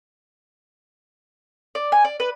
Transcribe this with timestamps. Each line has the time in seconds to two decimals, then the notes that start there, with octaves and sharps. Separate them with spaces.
1.75 D5
1.92 G#5
2.05 D5
2.20 B4